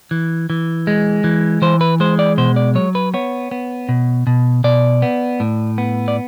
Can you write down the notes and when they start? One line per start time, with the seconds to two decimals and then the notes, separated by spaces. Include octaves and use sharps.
0.11 E3
0.50 E3
0.87 G#3
1.24 E3
1.62 E3 C5
1.81 B4
2.00 G#3 C5
2.19 D5
2.38 B2 C5
2.56 D5
2.75 F#3 C#5
2.95 B4
3.14 B3 C#5
3.51 B3
3.89 B2
4.27 B2
4.64 B2 D5
5.02 B3
5.40 A2
5.78 B3
6.08 D5